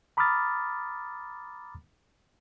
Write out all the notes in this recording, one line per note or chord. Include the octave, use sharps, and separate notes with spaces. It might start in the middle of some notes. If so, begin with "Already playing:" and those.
A#5 B5 D6 D#6 F6 A6